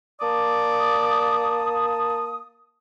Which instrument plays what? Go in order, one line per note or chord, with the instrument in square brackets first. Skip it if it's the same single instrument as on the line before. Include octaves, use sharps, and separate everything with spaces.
[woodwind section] A#3 A5 D#6 [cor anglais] D5